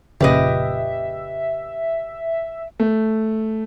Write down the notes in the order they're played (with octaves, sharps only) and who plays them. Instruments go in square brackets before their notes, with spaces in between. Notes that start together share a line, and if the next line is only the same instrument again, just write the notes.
[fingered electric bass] F1 [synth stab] A#2 C#3 [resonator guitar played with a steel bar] G4 B4 D#5 [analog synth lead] E5
[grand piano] A3